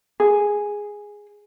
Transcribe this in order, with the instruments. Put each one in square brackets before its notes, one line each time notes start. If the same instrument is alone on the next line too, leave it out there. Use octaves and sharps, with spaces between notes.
[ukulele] G#4